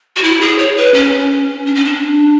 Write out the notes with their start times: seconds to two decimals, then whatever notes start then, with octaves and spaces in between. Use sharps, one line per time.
0.16 F#4
0.23 E4
0.41 G#4
0.58 C#5
0.77 B4
0.94 C#4
1.66 D4
1.75 C#4
1.85 D4